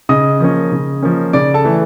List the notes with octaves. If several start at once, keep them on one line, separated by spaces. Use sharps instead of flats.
C#3 D#5 D#6
F3 A#3 C#4
C#3
F3 A#3 C#4
C#3 D5 D6
A4 A5
E3 A3